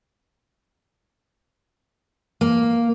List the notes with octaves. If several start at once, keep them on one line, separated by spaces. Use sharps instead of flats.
A#3